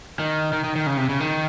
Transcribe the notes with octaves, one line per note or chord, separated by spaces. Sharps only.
D#3
D#3
D#3
D#3
C#3
C3
C#3
D#3